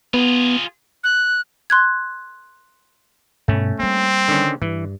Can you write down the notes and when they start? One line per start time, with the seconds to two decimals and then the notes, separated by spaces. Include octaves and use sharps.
0.14 B3 F4 G#4
1.04 F#6
1.70 C6 F#6 G#6
3.48 G2 B2 A3 C#4
3.80 G3 A#3 C4
4.28 D3 D#3 C#4
4.62 G2 E3